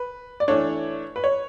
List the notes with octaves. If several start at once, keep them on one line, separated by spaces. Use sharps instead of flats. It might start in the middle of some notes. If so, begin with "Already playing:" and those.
Already playing: B4
D5
E3 A3 D4 C#5
B4
C#5